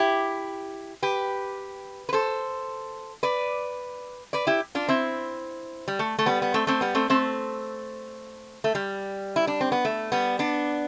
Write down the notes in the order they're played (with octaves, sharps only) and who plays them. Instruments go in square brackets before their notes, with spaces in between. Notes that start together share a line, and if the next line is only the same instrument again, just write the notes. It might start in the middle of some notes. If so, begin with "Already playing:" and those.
Already playing: [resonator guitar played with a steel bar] E4 G4
G4 B4
B4
A4 C5
B4 D5
B4 D5
E4 G4
D4 F4
C4 E4
G3
A3
A3
G3 B3
B3
A3 C4
A3 C4
G3 B3
A3 C4
A3 C4
A3
G3
E4
D4
C4
B3
A3
G3 B3
B3 D4